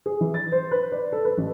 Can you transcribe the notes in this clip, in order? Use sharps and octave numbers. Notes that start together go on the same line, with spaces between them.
G#4
E3
A6
C5
B4
D5
A4
B4
A1